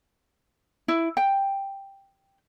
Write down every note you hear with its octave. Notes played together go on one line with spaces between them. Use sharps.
E4
G5